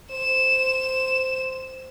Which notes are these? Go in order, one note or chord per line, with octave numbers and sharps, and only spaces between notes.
C5 E7